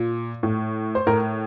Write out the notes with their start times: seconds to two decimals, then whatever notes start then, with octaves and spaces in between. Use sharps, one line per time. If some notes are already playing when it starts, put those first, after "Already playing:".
Already playing: A#2
0.43 A2
0.95 C5
1.07 A2 A#4